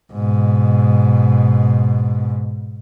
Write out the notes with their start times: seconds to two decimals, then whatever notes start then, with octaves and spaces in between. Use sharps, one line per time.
0.12 G#2 B2